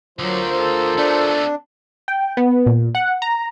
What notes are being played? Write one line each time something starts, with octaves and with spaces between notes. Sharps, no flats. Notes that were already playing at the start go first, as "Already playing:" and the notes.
D2 D3 F#3 F4 A#4 C5
A4
A3 B3 D4
G5
B3
A#2
F#5
A#5